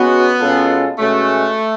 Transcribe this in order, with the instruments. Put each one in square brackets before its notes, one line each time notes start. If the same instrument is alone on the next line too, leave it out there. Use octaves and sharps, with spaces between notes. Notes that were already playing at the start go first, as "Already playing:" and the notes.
Already playing: [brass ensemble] G#3 C#4 F#4 [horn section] B3
[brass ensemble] B2 G#3 C#4 F4 A4
[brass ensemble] B2 G#3 C#4 F#4 [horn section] A3